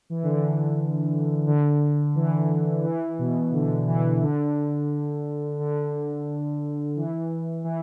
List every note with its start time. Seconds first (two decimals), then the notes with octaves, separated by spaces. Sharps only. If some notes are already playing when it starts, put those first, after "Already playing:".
0.10 E3
0.23 D3
0.36 E3
1.47 D3
2.15 E3
2.84 E3
3.19 B2
3.52 D3
3.87 E3
4.22 D3
5.59 D3
6.96 E3
7.64 E3